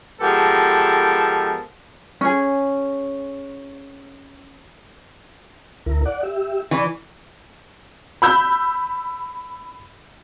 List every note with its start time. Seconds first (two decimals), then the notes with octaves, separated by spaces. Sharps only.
0.21 F3 G#3 B3 G4 A4 A#4
2.21 C#4 G#4
5.86 D2 E4 A#4
6.05 D5 F#5
6.23 G4 E5
6.71 E3 D5 C#6
8.22 B5 E6 G6